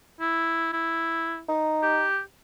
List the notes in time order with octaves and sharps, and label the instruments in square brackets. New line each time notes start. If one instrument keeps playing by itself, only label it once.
[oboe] E4
E4
[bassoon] D#4
[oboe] G4